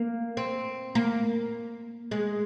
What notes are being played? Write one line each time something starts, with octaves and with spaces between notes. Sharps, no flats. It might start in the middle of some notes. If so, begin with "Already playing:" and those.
Already playing: A#3
C4
A#3
G#3